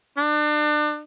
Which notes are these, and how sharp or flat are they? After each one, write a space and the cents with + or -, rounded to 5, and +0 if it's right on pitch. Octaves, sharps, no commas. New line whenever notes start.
D4 +35